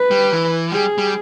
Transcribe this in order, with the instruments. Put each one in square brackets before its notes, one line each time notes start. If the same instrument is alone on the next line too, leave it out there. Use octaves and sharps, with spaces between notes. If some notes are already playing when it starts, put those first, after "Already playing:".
Already playing: [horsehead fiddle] B4
[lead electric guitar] G3
E3
[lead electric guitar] G3 [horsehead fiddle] G#4
[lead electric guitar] G3